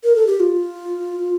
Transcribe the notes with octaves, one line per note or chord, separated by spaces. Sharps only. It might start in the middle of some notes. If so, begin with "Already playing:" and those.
A#4
A4
G4
F4